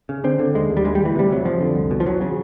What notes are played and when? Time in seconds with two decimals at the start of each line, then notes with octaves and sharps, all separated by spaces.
0.09 C#3
0.24 D3 C4
0.39 D3
0.55 D#2 G#3
0.70 D#2
0.77 G3
0.85 D2 G#3
0.95 G3
1.00 D2
1.05 E3
1.16 C3 G3
1.30 C3 F#3
1.45 F2 F3
1.61 D3
1.75 C2
1.91 B2
2.00 F3
2.06 E2 F#3
2.21 C#3